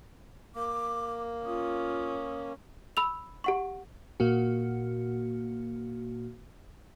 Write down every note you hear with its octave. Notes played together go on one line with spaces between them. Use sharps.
A#3 D6
C#4 F4 D#6
B5 E6 F7
G4 F#5 C#6
A#2 A#3 F#4